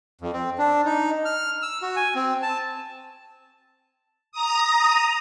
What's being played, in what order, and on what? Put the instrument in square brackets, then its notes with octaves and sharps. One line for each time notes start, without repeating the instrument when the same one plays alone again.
[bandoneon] F2
C4
D4
D#4
F6
E6
F#4
G#5
C4
A5
[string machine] A#5 D#6